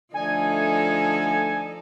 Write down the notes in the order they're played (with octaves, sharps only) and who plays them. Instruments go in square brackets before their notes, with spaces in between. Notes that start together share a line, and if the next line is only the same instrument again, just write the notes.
[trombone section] D3 A3 [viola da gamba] F3 D#4 A4 [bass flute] D5 [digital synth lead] G#5